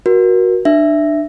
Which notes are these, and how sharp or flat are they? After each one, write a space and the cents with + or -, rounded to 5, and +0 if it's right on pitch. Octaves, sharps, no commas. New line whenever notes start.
F#4 +0 A#4 +30
D4 +30 E5 +0